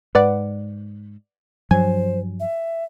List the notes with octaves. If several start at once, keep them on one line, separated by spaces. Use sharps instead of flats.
G#2 B4 D5 F#5
G2 F3 F#3 C5 G#5
E5